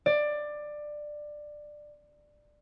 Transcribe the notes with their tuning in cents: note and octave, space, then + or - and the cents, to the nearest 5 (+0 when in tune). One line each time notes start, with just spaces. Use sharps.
D5 +15